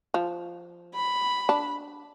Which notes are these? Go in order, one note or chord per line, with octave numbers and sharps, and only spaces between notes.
F3
B5
D4